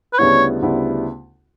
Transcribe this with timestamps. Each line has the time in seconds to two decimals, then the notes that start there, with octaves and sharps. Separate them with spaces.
0.13 B4
0.18 D2 C#3 G3 B3 E4 C#5
0.62 D2 C#3 G3 B3 E4